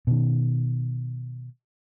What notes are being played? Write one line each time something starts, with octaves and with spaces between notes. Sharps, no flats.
B2 D#3